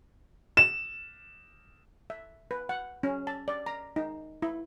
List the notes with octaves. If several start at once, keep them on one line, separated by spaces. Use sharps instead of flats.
E7
E5
B4
F#5
C#4
A5
D5
A#5
D#4
E4